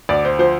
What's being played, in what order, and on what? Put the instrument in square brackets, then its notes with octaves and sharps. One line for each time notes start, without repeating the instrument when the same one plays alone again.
[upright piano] D2 D5
C5
F3 C5